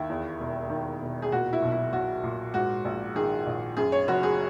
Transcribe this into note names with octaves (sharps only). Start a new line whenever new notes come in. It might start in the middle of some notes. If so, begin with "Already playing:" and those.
Already playing: D#2 D#3 E4
E2
E1
D#3
E1
G#4
A#2 F#4
E4
B1
E4
B1 F#4
A#2
G#2 F#4
A#1
D#3 G#4
A#1
F#2 G#4
C#5
F#1 F#4
G#4